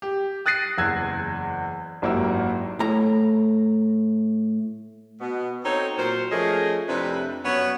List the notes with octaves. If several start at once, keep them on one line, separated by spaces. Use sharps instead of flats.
G4
D#6 F#6 A6 A#6 C7 D#7
F#1 E2 E6 G#6
G#1 F#2 A#3 E4 G4 E6
A2 A#5
B2 B3
C4 D#4 F#4 A4 C5 C#5
A#2 F#3 A#4 C5
F3 A3 C#4 G#4 A#4 D#5
F2 C3 A3 D4 E4 B4
F#2 B3 C#4 C#5